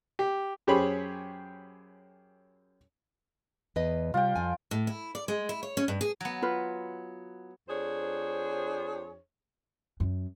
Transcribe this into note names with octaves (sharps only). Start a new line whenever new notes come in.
G4
F#2 G4 G#4 C5 C#5 B5
E2 B4 D#5
C3 G3 F4 G5
F2 G#5
A2
E4
D5
G#3
E4
C#5
C#4
G2
G#4
F#3 B3
F4 B4
F2 D4 G#4 C5 C#5
F#2